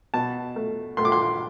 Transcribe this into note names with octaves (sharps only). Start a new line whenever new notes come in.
B2 A5
A3
A3 C6
D6
C6